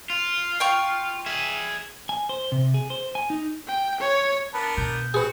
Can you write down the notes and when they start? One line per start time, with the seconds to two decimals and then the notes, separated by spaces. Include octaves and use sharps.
0.10 F4
0.60 G5 C#6
1.26 G#4 E5
2.09 G#5
2.29 C5
2.52 C3
2.74 G#4
2.90 C5
3.15 G#5
3.30 D#4
3.67 G5
4.00 C#5
4.54 B3 D4 A#4 A5 B5
4.77 B2 G6
5.14 C4 F#4 G#4 B4